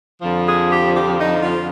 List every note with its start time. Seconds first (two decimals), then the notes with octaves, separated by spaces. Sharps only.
0.22 F2 D3 F3
0.46 G#4
0.70 G4
0.93 G4
1.18 D#4
1.41 F4